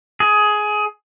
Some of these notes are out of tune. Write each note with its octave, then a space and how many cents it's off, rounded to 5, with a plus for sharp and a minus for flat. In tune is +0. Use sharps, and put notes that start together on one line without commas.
G#4 +15